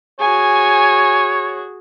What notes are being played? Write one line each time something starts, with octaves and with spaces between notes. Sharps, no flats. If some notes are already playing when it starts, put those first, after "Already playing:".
F#4 G#4 C#5 G#5